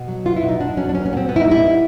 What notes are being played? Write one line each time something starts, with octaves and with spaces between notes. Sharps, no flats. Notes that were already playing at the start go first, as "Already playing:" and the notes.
Already playing: B2
F#3
B3 F4
E4
B2
D#4
B2 D4
F#3 C#4
D4
B3 C#4
C#4
A#2 B3
C4
A#2 B3
E4
D#4
G3
E4
B3